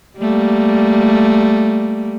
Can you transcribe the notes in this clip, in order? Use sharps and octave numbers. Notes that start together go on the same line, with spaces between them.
G3 A3 A#3